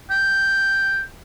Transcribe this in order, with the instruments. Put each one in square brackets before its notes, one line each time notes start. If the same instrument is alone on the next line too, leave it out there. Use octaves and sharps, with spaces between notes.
[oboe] G5